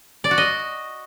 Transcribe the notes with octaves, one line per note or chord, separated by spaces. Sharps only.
D5
F#4
D#5